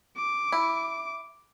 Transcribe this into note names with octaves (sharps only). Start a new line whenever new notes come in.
D6
E4